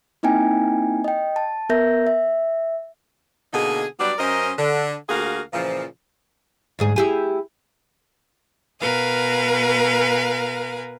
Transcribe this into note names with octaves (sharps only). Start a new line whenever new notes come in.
A#3 C4 D#4 E4 G5 G#5
D#5 G5
A5
B3 A#4 E5 G6 A#6
E5
B2 D3 A#3 D#4 G#4
F#3 G3 B3 D4 D5
F#2 C#4 A#4 C5 D#5
D3
D2 A#3 F4 F#4 G#4 F5
A#2 C#3 E3 F3
D2 G#2 G#4
E4 G4 G#4
B2 A#4 B4 F5 G#5